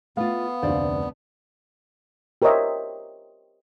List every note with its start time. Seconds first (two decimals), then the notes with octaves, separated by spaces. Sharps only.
0.17 A3 B3 F4 F5
0.63 F1 D2 C5 D5
2.42 G4 A#4 C5 C#5 D#5 E5